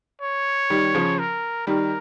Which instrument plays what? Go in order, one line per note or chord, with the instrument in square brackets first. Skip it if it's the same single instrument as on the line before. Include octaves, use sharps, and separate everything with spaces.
[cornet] C#5
[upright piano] D#3 G3
C#3 F3
[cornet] A#4
[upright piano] D#3 G3 [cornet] A#4